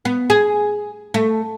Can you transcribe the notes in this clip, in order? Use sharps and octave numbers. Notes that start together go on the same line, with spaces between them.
B3
G#4
A3